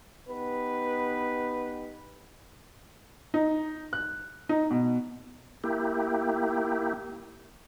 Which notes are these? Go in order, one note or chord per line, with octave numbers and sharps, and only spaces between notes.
B3 D#4 G4 B4
D#4
F#6
D#4
B2
A#3 E4 G4